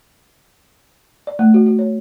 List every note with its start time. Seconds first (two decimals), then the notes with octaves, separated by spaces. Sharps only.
1.27 D5
1.39 A3
1.54 F#4
1.66 F#4
1.79 C#5